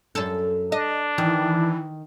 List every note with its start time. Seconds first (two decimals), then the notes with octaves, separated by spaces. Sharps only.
0.15 F#2 A4
0.72 D4 D#5
1.18 D#3 E3